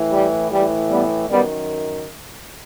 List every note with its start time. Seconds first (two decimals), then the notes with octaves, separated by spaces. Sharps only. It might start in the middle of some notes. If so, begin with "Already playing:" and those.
Already playing: A2 E3
0.11 G3
0.51 A2 E3 G3
0.89 G3 B3
1.29 F#2 D#3 G3 B3